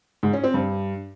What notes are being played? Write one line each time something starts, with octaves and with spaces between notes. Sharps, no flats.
G#2
C#4
C4
G2